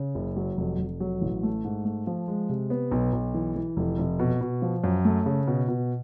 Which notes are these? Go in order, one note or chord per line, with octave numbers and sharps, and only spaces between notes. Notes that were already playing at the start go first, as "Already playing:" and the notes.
Already playing: C#3
F#1
F#3
F1
F1
F#3
A1
A3
G#2
A3
F3
G#3
C3
B3
B1
B1
E3
E3
F1
F1
B2
B2
F3
F#2
A3
C#3
B2
B2